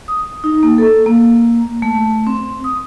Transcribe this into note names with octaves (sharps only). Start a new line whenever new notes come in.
D#6
D#4
A#3
A4
A#3
A3
C4
D#6